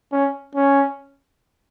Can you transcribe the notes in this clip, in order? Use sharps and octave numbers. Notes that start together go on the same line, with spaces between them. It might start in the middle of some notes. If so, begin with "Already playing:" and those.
C#4
C#4